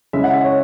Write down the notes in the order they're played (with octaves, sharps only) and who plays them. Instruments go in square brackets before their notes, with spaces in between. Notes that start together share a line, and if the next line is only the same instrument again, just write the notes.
[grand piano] C#3 G#3 C#4 E4 E5
F#5
E5
C#5